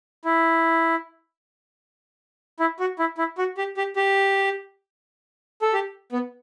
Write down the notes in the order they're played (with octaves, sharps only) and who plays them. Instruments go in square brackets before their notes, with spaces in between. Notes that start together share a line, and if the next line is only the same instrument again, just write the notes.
[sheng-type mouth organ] E4
E4
F#4
E4
E4
F#4
G4
G4
G4
A4
G4
B3